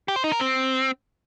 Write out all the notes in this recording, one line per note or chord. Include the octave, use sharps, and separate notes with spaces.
G4
C5
D#4
A#4
C4